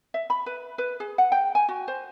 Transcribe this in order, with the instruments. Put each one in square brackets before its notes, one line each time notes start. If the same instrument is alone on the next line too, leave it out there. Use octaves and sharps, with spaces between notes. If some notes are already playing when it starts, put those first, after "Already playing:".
[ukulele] E5
B5
B4
B4
G#4
F#5
G5
G#5
F#4
C5